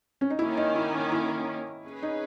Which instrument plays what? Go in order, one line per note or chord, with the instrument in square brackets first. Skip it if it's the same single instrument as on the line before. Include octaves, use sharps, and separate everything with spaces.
[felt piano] C#4
D#4
[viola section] D#3 A#3 C#4 [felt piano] E4
[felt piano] D#4
E4
E4
[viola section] C#4 G#4 B4
[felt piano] D#4